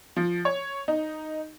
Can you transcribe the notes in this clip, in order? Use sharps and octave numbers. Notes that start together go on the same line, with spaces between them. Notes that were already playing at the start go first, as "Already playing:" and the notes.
F3
C#5
D#4